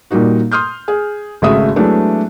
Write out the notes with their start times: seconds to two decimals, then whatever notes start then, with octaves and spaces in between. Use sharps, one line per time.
0.11 A#2 G3 A#3 D#4 F#4
0.52 C6 D#6 F6 G6
0.88 G#4
1.42 G#1 C#3 A3 F#4 E5 D#6
1.76 F#3 G#3 A3 B3 D4 E4